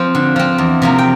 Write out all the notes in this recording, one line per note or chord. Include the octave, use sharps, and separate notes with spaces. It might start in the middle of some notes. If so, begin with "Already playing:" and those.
Already playing: F3 C4 C5
D3
F3 C4
E2
C3 F3 A#3
G5